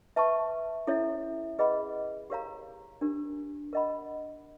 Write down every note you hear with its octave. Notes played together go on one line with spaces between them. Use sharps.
B4 E5 A5 C#6
C#4 E4 A4 C#5 E5
G#4 B4 D#5 F#5 B5
G4 A#4 C#5 F5 A#5
D4 G4 A#4
A#4 D#5 F#5 B5